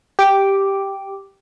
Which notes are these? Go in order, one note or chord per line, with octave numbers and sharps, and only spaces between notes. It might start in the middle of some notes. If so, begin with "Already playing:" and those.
G4 D6